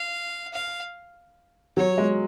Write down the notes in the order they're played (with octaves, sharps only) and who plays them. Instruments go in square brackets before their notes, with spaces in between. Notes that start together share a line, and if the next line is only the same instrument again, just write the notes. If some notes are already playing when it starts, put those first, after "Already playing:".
Already playing: [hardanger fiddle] F5
F5
[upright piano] F#3 [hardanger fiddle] C#5
[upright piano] G#3